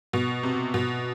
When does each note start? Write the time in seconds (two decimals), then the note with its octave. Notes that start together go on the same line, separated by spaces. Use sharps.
0.13 B2
0.43 C3
0.74 B2